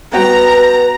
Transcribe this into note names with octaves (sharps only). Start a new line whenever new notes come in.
B3 F#4 B4 G5 A#5